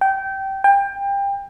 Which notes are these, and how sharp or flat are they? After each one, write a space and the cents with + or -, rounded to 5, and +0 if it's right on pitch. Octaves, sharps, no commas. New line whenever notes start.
G5 -20
G5 +25